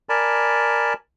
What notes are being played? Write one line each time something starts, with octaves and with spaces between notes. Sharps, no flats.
A#4 D5 G#5 A5 B5